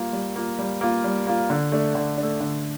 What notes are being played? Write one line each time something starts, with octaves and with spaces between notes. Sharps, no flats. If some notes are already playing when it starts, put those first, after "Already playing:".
Already playing: G3 A#3 F4
G3
A#3 F4
G3
A#3 F4
G3
A#3 F4
D3
A3 D4
D3
A3 D4
D3